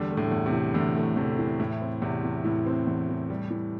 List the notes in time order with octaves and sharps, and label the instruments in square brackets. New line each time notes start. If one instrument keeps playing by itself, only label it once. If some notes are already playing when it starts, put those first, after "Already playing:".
Already playing: [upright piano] E2 [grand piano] D3 G3
[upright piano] A3
[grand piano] A2 D3
[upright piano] E2
[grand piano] C3
[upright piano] E3
[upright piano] E2 [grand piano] A2 D3
[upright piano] A3
[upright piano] E2 [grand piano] C3
[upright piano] E3
[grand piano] A2 [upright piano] E4
[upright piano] C4
[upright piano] E2 [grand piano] C3
[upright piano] E3
[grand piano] A2 [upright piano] E4
[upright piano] C4
E2
E3
G3
E3